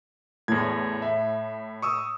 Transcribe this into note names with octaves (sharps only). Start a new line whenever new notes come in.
E2 A2 G#6
E5
C#6 D#6 E6